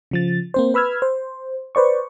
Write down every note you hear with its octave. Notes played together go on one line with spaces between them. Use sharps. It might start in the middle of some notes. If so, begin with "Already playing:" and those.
C#3 F3 A6
A#3 C4 C5
B4 B5 E6 F6 G#6
C5
B4 C5 D5 C#6